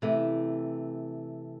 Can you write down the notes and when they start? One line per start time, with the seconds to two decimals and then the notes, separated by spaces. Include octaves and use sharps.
0.02 C3 E3 A3